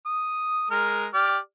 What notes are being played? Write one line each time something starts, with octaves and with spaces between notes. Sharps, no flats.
D#6
G#3 A#4 F6
G4 D5 F6